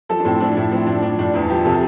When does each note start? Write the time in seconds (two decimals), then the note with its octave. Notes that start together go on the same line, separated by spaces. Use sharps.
0.09 F3 A4
0.20 D4
0.25 A2 C4
0.40 F3 D4
0.57 A2 E4
0.71 F3 C4
0.87 A2 D4
1.03 F3 D4
1.18 A2 D4
1.34 E2 E4
1.50 F3 G4
1.65 C3 A4